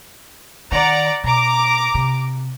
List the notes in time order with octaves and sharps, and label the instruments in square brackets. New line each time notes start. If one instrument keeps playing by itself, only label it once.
[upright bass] D#3 [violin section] D5 F#5 A#5
[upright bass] B2 [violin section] A#5 D6
[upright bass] C3